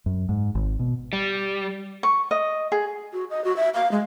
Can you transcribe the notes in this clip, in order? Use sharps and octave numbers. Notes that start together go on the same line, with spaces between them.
F#2
G#2
G#1
B2
G3
C#6
D#5
G#4
F#4
D#5
F#4
E5
F5
G#3